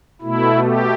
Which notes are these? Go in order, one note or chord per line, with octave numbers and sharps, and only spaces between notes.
B2 A3 E4
G4